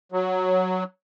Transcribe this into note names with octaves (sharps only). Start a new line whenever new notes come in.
F#3